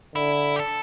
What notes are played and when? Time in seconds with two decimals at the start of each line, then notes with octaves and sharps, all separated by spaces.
0.15 D3 E4
0.56 G4
0.60 A4